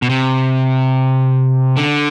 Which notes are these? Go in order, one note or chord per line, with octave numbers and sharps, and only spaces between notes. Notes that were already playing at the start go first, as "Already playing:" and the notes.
B2
C3
D3